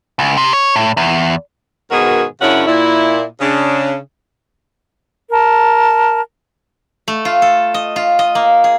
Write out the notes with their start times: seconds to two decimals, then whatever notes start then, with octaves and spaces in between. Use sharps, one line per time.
0.19 C#2
0.37 C3
0.53 C#5
0.76 A2
0.97 E2
1.91 G#2 B2 D#3 F#4 G#4 A#4
2.41 F#2 C#3 C#4 D4 E4 F#5
2.67 A#2 E4
3.41 C#3 D4
5.31 A#4 A5
7.08 A3
7.25 F4
7.42 A4
7.74 D#5
7.96 F4
8.19 D#5
8.35 A#3
8.64 G#4